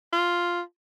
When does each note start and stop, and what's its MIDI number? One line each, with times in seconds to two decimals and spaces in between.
0.13 0.61 65